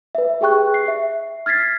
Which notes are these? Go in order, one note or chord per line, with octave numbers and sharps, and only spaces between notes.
B4 E5
G4 G#4 G5 C#6 F#6
C7
E5
F6 G#6 A6 B6 C7